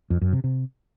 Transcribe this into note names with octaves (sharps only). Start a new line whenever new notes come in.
F2
F#2
C3
C3